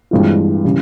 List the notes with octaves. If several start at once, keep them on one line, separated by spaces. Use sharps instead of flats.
G2 E3 G#3 C4 F4
C#3 E3 G3